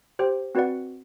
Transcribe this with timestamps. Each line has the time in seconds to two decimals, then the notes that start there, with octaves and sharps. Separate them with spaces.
0.19 G4 C5 G5
0.55 C4 F#4 B4 D5 F#5